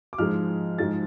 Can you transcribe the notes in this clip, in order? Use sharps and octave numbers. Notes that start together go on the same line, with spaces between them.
D6
G#2 F3 G#3 F6
G#2 F3 G#3 A6